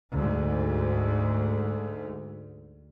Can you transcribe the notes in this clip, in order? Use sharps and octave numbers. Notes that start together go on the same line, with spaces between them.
D2 G#2